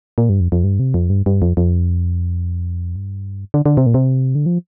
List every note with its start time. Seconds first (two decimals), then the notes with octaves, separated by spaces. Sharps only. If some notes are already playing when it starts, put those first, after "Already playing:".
0.18 A#2
0.29 G2
0.41 F2
0.52 F2
0.64 G2
0.79 C3
0.94 F2
1.10 G2
1.26 G2
1.42 F2
1.57 F2
2.96 G2
3.54 D3
3.66 D3
3.77 C3
3.86 A#2
3.94 C3
4.35 D3
4.46 F3